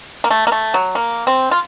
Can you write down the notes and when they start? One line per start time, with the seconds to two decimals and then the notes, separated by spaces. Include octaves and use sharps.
0.24 A#3
0.30 A3
0.47 A#3
0.52 A3
0.74 F#3
0.95 A#3
1.27 C4
1.51 F4